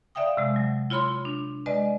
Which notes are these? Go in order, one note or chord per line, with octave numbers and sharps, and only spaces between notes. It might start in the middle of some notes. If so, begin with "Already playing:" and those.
D5 E5 F5 G5 D#6
C3 G#3
F#3
E4 F4 C#5 B5 C6
D4
G#3 B4 D5 D#5